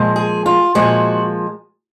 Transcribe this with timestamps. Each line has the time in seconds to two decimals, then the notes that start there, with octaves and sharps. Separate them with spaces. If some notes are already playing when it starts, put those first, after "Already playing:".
Already playing: A#2 F3 G#3
0.16 G#4
0.46 F4
0.75 A#2 F3 G#3 F#4